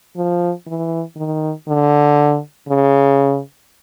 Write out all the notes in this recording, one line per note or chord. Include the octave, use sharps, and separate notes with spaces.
F3
E3
D#3
D3
C#3